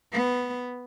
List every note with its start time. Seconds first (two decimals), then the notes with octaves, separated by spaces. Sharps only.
0.12 B3